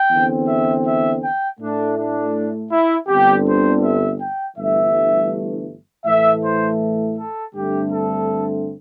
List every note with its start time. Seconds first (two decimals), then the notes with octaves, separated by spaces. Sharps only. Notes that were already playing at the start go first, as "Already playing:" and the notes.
Already playing: G5
0.10 E2 D3 C4
0.47 E5
0.85 E5
1.21 G5
1.59 A2 A3 D4
1.96 D4
2.71 E4
3.08 G1 G2 D3 C4 G4
3.45 C5
3.82 E5
4.20 G5
4.57 G1 G2 E3 A3 E5
6.06 A2 E3 A3 E5
6.43 C5
7.17 A4
7.54 G2 D3 A3 C4 G4
7.91 A4